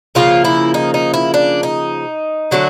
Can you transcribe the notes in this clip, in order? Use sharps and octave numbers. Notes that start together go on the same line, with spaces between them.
C#3 F3 A#3 F4
E4
D#4
D#4
E4
D4
D#4
D3 F#3 A3 D4